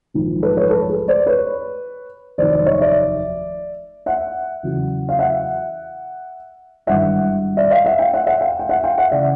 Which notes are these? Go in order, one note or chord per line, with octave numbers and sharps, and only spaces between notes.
A#1 G#2 D#3 F#3
A4 B4
B4 C#5
A4 B4
G#4
C5 D5
B4 C#5
F1 D#2 D#3 F#3 C5 D5
C5 D5
C#5 D#5
D5 E5
E5 F#5
E2 C#3 F#3
F5
E5 F#5
G#1 G2 E3 E5 F#5
D5 E5
D#5 F5
E5 F#5
F5 G5
E5 F#5
E5 F#5
F5 G5
G5
E5 F#5
F5 G5
E5 F#5
C#3 E3 D5 E5